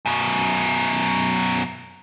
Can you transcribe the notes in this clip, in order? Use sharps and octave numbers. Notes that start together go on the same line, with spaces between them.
F#2 B2